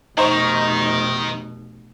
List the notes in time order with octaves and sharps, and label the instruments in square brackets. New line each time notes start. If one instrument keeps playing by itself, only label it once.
[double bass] F1 B2 [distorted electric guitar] D#3 [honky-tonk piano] D#4 C5 C#6